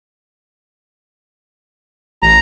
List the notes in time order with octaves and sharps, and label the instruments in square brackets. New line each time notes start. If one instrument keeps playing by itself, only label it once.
[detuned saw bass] A1 [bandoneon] A#5